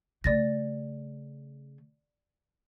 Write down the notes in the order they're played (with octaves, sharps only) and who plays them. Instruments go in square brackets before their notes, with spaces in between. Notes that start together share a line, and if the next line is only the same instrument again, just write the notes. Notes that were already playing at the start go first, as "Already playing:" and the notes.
[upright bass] C#3 A3 [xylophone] D5 A6 A#6